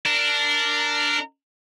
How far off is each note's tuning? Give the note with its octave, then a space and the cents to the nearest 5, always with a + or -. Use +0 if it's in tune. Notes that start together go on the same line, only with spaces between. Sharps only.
D4 +0 A#4 -15